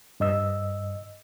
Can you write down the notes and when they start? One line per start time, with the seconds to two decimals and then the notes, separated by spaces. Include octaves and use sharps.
0.20 G2 D#5 E6